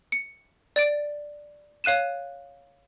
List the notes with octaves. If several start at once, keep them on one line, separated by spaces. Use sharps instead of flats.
C#7
D5 A6 D7
C#5 F5 F#6 D#7 E7